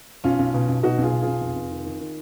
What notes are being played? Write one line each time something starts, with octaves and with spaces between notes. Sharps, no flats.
B1 C#4 F4
B1
B2
B1
B2 D#4 F#4
B1 F4 G#4
B2
F4 G#4
B1
F1
F1
D#3
D#3
D#3